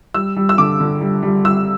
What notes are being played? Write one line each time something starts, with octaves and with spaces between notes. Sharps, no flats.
G3 E6
G3
E6
D3 D6
D3
G3
G3
G3 E6